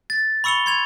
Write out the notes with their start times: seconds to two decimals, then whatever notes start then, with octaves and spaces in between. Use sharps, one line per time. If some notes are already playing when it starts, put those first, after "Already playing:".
0.10 A6
0.44 B5 C#6 E6 C#7 F7 G7
0.66 C6 G#6 F7